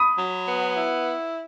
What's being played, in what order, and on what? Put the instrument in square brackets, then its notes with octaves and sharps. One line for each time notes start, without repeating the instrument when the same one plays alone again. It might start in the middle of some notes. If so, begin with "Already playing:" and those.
Already playing: [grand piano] B5 D#6
[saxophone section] F#3
B3
E4